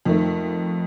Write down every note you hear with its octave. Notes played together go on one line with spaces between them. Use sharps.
F2 D#3 A3